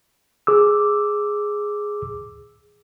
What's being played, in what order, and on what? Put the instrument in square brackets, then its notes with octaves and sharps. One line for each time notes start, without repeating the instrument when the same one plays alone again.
[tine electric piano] G#4 D6 E6